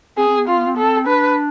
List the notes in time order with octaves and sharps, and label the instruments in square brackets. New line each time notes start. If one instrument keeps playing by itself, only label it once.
[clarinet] C4 [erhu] G#4
[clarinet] C4
B3
[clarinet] C4 [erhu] F4
[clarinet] B3
C4
[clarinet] B3 [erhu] A4
[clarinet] C4
[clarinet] D4 [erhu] B4